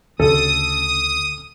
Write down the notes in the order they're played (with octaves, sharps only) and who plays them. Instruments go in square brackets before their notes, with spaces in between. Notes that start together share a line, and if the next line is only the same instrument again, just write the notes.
[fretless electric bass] D2 C#3 [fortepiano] A4 [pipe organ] D#6